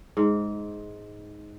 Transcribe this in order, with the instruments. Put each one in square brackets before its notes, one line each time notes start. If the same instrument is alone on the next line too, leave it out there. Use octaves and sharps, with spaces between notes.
[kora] G#2